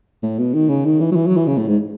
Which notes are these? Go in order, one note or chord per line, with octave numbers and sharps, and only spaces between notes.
A2
B2
D#3
C#3
D#3
E3
F#3
E3
F#3
E3
C#3
A2
G#2